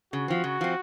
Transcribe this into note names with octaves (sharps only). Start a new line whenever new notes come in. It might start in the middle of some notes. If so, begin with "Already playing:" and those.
C#3 F#4
F3 C4
C#3
F3 C4